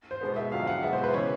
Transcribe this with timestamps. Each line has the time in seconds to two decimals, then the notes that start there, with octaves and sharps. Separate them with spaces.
0.11 C5
0.21 B2 G#3 B3
0.36 E5
0.52 F2 D3 F#3 F5
0.67 F#5
0.83 B2 G#3 B3 E5
0.93 C5
1.04 B4
1.14 C#3 E3 C#5